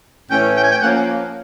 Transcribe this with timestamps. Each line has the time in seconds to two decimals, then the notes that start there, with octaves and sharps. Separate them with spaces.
0.30 A2 E3 A3 C#4 G5
0.57 G5
0.63 G#5
0.71 G5
0.81 F3 A#3 C#4 F#5